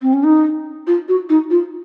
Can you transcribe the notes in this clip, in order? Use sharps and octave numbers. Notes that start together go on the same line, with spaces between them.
C4
C#4
D#4
F4
F#4
D#4
F4